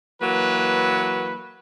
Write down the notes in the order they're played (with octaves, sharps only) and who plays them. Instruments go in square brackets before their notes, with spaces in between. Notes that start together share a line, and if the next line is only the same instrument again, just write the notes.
[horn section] E3 F#3 A#3 B4